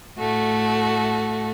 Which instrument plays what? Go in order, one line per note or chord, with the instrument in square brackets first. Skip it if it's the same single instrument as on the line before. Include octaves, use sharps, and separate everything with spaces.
[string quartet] A2 A3 F#4